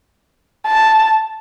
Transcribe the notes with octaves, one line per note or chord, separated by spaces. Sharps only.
A5